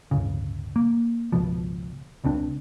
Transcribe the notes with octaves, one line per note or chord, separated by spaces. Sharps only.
D1 G1 C#3
A#3
G#1 C#2 B2 F3
E1 C#2 C4 D4